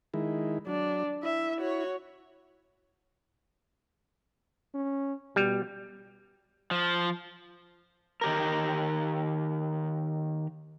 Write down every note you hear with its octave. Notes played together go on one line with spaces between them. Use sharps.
D#3 G#3 E4
F#3 D4
E4 E5
F#4 C#5
C#4
B2 G3
F3
D#3 G4 A#4